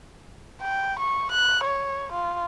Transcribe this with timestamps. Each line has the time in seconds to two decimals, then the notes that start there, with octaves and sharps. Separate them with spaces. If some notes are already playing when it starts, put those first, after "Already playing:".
0.62 G5
0.99 C#6
1.32 F#6
1.64 C#5
2.12 F4